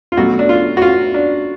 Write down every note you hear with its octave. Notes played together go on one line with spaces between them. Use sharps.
F4
B2 F#3 A3 F#4
D4
F4
F#4
F4
D4